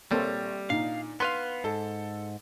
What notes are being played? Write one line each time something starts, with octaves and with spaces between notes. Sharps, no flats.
A#1 G3 A#3 C4 A4 C#5 C6
A#2 D4 D#4 F5
B3 B4 F5 C6
G#2 A4